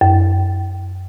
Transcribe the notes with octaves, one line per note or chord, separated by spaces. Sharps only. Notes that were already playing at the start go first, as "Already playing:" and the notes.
F#2